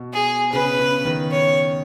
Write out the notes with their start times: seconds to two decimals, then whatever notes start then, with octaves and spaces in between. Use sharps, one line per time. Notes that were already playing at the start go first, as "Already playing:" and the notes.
Already playing: B2
0.13 G#4
0.53 C#3 B4
0.79 C#3
1.05 D#3
1.31 C#5